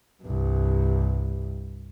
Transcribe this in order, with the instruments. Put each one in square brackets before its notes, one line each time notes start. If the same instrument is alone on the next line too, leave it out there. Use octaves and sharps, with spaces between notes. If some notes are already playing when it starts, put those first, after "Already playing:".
[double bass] C2 G2